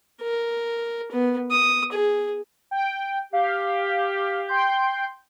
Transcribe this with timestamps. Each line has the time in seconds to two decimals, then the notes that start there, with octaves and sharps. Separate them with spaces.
0.22 A#4
1.12 B3
1.51 D#6
1.92 G#4
2.71 G5
3.33 G4 F5
4.48 G5 C6 G6